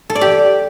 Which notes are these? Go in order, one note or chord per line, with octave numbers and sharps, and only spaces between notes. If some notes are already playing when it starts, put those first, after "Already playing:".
A4
D5
G4